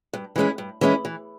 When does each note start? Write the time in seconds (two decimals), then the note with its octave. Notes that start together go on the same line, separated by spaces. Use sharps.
0.13 G2
0.36 E3 G#3 C#4 E4
0.58 G2
0.81 E3 G#3 C#4 E4
1.05 E3